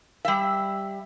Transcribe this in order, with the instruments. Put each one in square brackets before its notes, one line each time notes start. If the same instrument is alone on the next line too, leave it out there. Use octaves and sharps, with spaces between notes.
[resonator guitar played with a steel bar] G3 E5